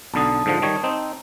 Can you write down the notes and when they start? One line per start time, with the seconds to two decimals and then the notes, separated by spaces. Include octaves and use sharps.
0.14 B1 D3 A5 D#6
0.46 G#2 D3 F3
0.62 D#3 G3 C#5
0.84 C4 D#4